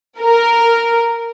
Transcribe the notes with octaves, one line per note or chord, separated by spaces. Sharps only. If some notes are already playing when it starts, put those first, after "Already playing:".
A#4